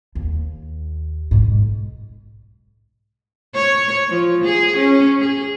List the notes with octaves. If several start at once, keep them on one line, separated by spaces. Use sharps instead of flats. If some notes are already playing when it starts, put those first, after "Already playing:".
D#2
B1 G#2
C#5
F3
G#4
C#4
G#4